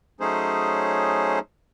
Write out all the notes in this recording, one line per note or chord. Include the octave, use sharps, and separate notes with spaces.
F#3 A3 C#4 D#4 G#4 C5